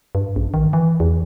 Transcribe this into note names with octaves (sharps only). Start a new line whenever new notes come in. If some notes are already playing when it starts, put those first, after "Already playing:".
G2
A#1
D#3
E3
E2